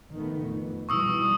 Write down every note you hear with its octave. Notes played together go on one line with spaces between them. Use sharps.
D#3 A3 B3
F2
B2 E3 G3 C#6 D#6 E6